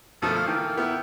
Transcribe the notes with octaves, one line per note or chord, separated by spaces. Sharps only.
B2 F3 A3 A#3 A4 A#4
F5 F6
E3 G5
B3 E4